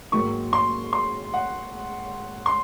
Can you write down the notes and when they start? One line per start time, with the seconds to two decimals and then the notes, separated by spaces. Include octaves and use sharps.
0.12 G#2 D#3 F#3 A#3 C#6
0.53 C6
0.93 C6
1.34 F#5
2.46 C6